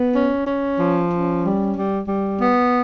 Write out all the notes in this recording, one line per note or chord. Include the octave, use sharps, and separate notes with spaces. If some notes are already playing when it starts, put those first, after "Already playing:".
Already playing: B3
C#4
C#4
F3
C#4
G3
G3
G3
B3